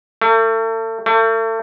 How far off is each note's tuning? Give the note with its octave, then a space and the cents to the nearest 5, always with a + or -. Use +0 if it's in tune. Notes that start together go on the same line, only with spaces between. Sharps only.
A3 +35
A3 +35